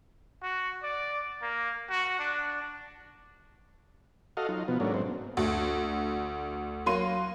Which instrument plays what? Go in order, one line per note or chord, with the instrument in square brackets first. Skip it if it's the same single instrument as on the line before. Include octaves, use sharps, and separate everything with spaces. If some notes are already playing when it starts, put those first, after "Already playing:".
[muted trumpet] F#4
D5
A#3
F#4
D4
[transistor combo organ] F#4 A4 D#5 F5
F#3 D#4 F4
B2 F3 B3
G#2 F#3 A3 A#3 C#4 D4
G#2 F#3 C4
[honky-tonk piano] D2
F#3 A#3 C6 D#7